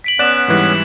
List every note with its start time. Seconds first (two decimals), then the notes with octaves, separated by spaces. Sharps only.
0.04 B6 D7 F#7
0.19 B3 C#4 D5 F#5 F#6 E7
0.48 G#2 E3 G3